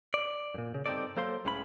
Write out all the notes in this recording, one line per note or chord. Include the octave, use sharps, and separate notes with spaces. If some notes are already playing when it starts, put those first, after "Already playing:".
D5
F#2 A#2
C#3
G2 C4 D4 D#4 A4 D5
F#3 A#3 A4 C5 F5 C6
C#2 A2 C#3 G#3 C#4 B5